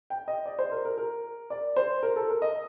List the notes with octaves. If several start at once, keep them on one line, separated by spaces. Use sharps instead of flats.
G5
D#5
D5
C5
A#4
A#4
A#4
D5
C5
A#4
A4
A#4
D#5